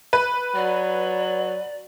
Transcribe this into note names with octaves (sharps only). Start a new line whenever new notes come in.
B4
F#3 D5